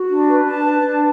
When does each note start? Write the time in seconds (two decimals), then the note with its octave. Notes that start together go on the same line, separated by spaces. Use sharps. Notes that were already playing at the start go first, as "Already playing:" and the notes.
Already playing: F#4
0.08 D4
0.28 B4
0.45 D4 A5
0.64 B4
0.84 D4